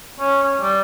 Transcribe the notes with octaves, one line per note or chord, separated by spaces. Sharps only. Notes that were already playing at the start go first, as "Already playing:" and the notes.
C#4
C#4
G3